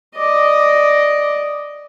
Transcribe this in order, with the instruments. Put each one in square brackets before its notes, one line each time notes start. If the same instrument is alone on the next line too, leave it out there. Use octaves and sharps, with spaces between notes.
[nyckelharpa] D5 D#5